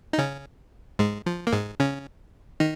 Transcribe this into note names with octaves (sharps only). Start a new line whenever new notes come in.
D#4
C#3 C#4
G#2 G#3
F3
A#3
G#2 G#3
C#3 C#4
D#3 D#4